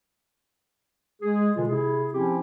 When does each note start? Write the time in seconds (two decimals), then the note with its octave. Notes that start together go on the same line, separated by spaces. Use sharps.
1.22 G#3 G#4
1.56 B2 D3 E3 G#3 F4
1.68 C3 E4 G#4
2.14 F3 C4 C#4 E4 G4